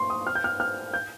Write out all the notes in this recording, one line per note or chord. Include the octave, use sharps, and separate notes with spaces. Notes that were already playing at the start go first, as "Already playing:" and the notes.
Already playing: C6 C#6
D#6
F6
G6
F6
F6
G6